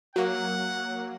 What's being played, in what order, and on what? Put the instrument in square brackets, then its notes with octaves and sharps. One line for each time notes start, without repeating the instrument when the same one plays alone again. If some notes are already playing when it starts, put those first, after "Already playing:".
[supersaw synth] F#3 A#3 [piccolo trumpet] F#5